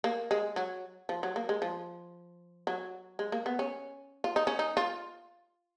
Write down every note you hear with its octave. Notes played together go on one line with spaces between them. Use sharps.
A#3
G#3
F#3
F3
F#3
A#3
G#3
F3
F#3
G#3
A#3
B3
C#4
F4
D#4
C#4
D#4
F4